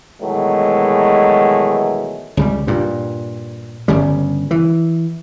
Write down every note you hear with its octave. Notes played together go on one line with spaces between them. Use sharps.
B2 D#3 E3 F#3 G#3 A3
C#2 C#3 G3
G2 A#2
G1 C#3 G3
E3